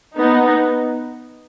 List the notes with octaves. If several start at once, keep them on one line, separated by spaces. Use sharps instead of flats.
B3 D#4